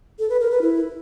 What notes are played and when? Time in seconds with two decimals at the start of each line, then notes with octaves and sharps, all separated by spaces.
0.19 A4
0.30 B4
0.40 A#4
0.51 B4
0.62 E4